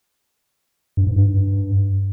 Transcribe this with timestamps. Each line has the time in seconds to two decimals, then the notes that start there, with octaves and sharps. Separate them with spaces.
0.97 G2
1.07 G#2
1.16 G2